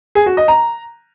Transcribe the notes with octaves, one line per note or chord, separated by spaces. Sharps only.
G#4
F#4
D#5
A#5